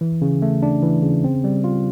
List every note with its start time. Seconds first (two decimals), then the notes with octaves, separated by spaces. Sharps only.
0.01 E3
0.22 C#3
0.42 A3
0.63 D4
0.83 E3
1.03 C#3
1.24 C4
1.44 G3
1.64 F4